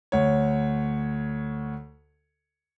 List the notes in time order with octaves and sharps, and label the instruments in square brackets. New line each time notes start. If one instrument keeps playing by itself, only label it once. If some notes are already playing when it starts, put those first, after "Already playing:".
[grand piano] D2 C#5